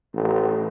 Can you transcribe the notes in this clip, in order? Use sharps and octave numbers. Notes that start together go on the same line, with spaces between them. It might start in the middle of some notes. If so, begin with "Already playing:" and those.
A1